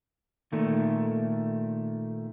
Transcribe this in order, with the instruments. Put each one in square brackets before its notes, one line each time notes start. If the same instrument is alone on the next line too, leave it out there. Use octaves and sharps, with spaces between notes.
[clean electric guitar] A#2 D#3 A3